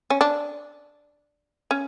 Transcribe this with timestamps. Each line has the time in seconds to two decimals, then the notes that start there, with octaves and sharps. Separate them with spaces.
0.10 C#4
0.21 D4
1.71 C#4